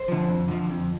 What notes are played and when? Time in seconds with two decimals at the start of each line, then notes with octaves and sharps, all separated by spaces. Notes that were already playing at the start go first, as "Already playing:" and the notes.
Already playing: C5
0.08 D3 F3
0.28 F2
0.48 D3 F3
0.69 F2